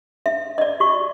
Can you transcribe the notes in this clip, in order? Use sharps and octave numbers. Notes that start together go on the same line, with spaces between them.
E5
D5 D#5
F#4 C#6